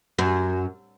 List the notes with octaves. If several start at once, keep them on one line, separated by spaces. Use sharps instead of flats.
F#2